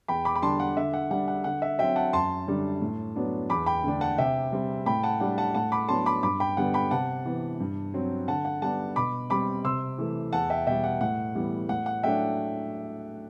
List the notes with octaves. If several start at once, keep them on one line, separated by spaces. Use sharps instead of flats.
E2 G5 B5
B5 D6
B5
D3 G3 D4 A5 C6
F#5
D3 E5
F#5
G3 D4 F#5
F#5
D3 F#5
E5
F#3 C4 E5 G5
F#5 A5
F#2 A5 C6
D3 G3 D4
A2
F#3 B3 D4
E2 B5 D6
G5 B5
D3 A3 D4
F#5 A5
C3 E5 G5
G3 C4
A2 G5 B5
F#5 A5
G3 D4 F#5
F#5 A5
A2 F#5 A5
B5 D6
F#3 B3 D4 A5 C6
B5 D6
G2 B5 D6
G5 B5
D3 G3 B3 D4 F#5
G5 B5
C3 F#5 A5
E3 B3
G2
F#3 C4
D3 F#5 A5
F#5
G3 B3 D4 F#5 A5
B2 B5 D6
G3 C4 B5 D6
C3 C6 E6
E3 A3
E2 F#5 A5
E5 G5
B2 G3 E5 G5
F#5
A2 F#5
E3 G3 B3
A2 F#5
F#5
F#3 A3 D4 E5 G5